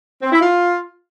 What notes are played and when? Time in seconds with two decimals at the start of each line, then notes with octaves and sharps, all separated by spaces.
0.22 C4
0.32 E4
0.42 F4